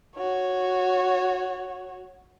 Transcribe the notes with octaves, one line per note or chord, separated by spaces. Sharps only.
F#4 C#5